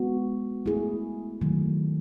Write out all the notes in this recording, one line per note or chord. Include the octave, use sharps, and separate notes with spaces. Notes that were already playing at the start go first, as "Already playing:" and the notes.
Already playing: G#3 B3 F#4
A3 E4 G#4
D#3 F#3 A3